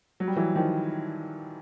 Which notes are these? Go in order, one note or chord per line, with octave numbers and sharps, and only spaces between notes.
F#3
G3
E3 F#3
D#3 F3